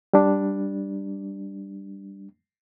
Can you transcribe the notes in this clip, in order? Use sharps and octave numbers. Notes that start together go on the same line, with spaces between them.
G3 D4